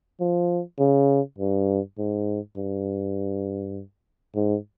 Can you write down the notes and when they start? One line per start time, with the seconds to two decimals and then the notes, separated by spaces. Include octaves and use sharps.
0.20 F3
0.79 C#3
1.38 G2
1.98 G#2
2.57 G2
4.36 G#2